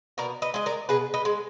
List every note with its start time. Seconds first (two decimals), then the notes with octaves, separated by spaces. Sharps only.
0.18 B2 A#4 D5
0.42 B4 D#5
0.54 G#3 D#5
0.66 A#4 D5
0.89 B2 G#4 B4
1.14 B4 D#5
1.25 G#3